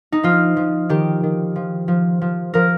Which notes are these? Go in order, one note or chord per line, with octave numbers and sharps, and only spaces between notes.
D#4
F3 F4
F3
D#3 G4
D#3
F3
F3
F3
F3 A#4